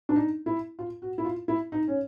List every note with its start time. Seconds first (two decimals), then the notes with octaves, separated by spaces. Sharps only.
0.09 D4
0.15 D#4
0.46 E4
0.79 F4
1.02 F#4
1.18 E4
1.25 F4
1.48 E4
1.72 D#4
1.88 C#4